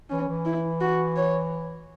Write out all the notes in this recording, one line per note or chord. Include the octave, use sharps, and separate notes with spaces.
E3 C#4
E3
E4
F#4
C#5